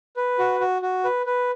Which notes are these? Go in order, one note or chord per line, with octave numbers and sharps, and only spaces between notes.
B4
F#4
F#4
F#4
B4
B4